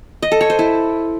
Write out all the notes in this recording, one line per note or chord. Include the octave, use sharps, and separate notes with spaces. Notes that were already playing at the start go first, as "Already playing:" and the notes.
D#5
A4
C#5
C5
E4